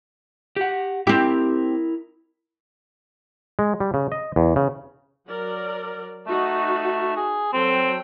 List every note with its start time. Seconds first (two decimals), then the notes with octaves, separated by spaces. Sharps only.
0.56 G4 F#5
1.07 C4 E4 G4 A#4
3.59 G#3
3.80 G3
3.94 C#3
4.12 D#5
4.36 E2
4.56 C#3
5.28 F#3 A#4 D5
6.26 A3 D#4 F#4
7.17 G#4
7.52 F#3 C4 A4 G5